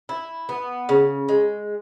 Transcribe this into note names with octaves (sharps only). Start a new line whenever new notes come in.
E4
B3
C#3
G#3